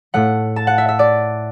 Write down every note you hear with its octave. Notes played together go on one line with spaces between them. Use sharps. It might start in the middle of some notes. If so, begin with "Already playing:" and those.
A2 A3 F#5
A5
F#5
E5
E5
D5